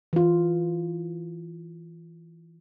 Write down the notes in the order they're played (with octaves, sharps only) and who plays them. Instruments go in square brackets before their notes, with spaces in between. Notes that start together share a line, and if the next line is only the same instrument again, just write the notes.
[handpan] E3 F4